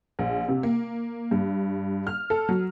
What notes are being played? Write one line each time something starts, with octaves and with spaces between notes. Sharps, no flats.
A#1
C3
A#3
G2
F6
A4
F#3